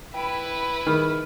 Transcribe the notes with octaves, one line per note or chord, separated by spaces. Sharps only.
E4 B4 G5
D#3 G#4 B5 F6